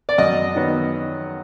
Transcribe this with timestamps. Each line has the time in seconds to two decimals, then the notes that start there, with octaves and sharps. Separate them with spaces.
0.09 D5
0.18 F#2 D#5
0.55 D#3 F#3 B3